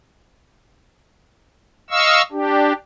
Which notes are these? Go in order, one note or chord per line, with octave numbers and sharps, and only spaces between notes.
D#5 F5 C#6 E6
D4 G4